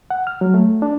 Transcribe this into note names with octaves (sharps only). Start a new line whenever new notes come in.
F#5
F6
F#3
A3
D4